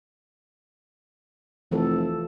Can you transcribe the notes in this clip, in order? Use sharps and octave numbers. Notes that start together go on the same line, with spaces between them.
F1 E3 F3 A4